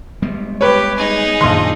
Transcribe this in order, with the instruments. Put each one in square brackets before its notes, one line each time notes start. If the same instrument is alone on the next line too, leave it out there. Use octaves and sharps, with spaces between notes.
[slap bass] G3 G#3 B3
[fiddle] G4 [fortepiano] B4 C#5
[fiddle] D#4 G#4
[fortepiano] A#1 C6 [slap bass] F#2 D#3